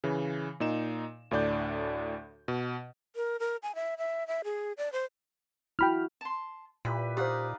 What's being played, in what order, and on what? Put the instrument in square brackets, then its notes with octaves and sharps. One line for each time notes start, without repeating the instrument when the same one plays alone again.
[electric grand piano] C#3 E3
A#2 D#4 E7
D2 A2 D4 D5 G6
B2
[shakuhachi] A#4
A#4
G#5
E5
E5
E5
G#4
D5
C5
[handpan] E4 F#4 [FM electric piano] G5 B5 F6
[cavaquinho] A5 C6
[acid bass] A#2 [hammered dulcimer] E4 G4 B4 [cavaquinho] B5
[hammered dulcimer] D#4 D#5 F5 [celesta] G4 C5 [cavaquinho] D5 F#5